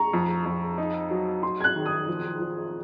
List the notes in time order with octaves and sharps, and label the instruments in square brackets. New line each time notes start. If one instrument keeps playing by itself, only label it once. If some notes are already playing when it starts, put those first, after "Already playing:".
Already playing: [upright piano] A#5 C#6
[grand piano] F2
F2
D#4
F#3
[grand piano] F#3 [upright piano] C6
[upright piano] G#6
F#6
[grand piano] D#3
[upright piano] D#6
[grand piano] F3
F3